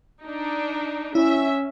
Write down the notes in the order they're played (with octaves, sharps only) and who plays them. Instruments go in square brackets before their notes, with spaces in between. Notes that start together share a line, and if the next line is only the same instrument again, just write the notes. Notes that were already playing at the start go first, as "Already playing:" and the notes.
[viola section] D4 D#4
[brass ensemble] C#4 [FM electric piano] E4 [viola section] E5